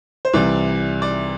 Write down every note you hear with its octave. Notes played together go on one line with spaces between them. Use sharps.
C5
C2 C3 E3 D5
D5